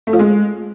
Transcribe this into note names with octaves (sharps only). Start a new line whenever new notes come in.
A3
F3
G#3